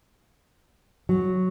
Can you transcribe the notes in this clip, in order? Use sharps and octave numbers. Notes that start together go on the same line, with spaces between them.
F#3